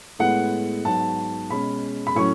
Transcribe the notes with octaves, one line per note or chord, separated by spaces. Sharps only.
A2 G#3 B3 F#5
G#2 F#3 B3 A5
B2 G#3 C#4 B5
B5
A2 F#3 C#4 C#6